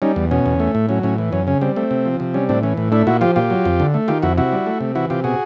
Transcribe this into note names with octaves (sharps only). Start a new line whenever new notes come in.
G3 C#4 D#4
E2
B2 C#4
E2
A3
A2
F#3 C#4
A2 C#4
E3
F#2 C#4
C#3 C#4
G3 C4
A3 C4
C3
F3
C3
G3 C#4
A2 C4 D4
E3 C#4
A2
A3 D4 E4
A#2 E4 F#4
F3 F4 G4
A#2 F4 G4
F#3
F2
D3
A3
D#3 F4 G4
F2 E4 F#4
C3 E4 F#4
G3
A3
C3
E3 E4 F#4
C3 F4 G4
B2 F#4 G#4